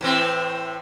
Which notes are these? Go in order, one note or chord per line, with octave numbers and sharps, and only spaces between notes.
A2 E3 C4